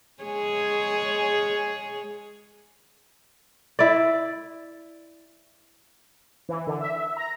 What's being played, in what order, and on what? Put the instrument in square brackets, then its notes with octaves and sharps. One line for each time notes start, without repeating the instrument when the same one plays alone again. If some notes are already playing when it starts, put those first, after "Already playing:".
[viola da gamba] G#3 G#4 C#5
[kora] E4 D5
[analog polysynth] E3
D3
E5
A#5